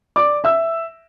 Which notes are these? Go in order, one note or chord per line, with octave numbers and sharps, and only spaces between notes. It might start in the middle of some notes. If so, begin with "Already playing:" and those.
D5 D6
E5 E6